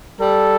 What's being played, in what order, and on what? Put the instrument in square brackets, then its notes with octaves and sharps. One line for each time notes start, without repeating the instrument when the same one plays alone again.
[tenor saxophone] G3 [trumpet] A4